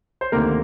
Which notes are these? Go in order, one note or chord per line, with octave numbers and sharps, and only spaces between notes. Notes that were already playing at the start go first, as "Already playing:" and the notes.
C5
D2 C3 D#3 A#3 A#4